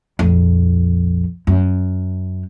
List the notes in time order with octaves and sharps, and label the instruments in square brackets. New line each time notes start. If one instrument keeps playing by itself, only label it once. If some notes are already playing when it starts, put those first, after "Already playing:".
[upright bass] A#1 F2
F#2